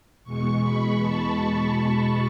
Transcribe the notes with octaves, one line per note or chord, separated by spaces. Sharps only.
E2 B2 G#3 C#6
B5
A5